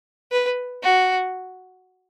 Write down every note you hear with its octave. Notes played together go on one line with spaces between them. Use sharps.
B4
F#4